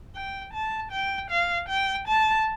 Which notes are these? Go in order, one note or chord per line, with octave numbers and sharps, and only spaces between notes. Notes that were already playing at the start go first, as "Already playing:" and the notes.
G5
A5
G5
F5
G5
A5